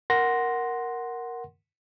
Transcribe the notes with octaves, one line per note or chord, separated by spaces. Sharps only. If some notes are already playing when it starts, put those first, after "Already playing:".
A#4 F#5 C6 A#6